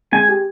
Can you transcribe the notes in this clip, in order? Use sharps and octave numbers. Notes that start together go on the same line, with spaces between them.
G#3 G#5
G4